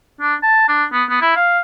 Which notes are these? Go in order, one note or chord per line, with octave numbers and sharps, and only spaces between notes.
D4
A5
D4
B3
B3
E4
F5